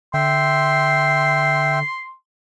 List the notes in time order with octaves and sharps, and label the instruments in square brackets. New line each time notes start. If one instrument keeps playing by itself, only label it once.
[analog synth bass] D3 [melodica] E5 G5 [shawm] C6